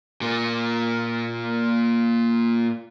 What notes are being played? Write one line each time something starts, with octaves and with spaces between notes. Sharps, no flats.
A#2 A#3